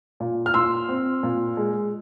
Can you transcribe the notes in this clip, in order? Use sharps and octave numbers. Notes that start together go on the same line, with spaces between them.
A#2
F6
A#2 C6 E6
C4
A#2
G#3